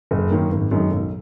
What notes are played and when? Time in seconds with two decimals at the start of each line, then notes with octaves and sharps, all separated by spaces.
0.11 F#1
0.31 F#2 D#3 A#3
0.51 G#1
0.71 F#2 D#3 G#3 D#4
0.91 B1